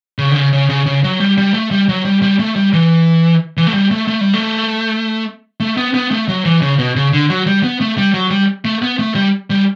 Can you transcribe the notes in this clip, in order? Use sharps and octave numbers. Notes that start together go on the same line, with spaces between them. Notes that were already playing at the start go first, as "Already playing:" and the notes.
C#3
D3
C#3
C#3
C#3
C#3
F#3
G3
G3
A3
G3
F#3
G3
G3
A3
G3
E3
E3
A3
G3
A3
A3
G3
A3
A3
B3
B3
A3
F#3
E3
C#3
B2
C#3
D3
F#3
G3
B3
A3
G3
F#3
G3
A3
B3
A3
G3
G3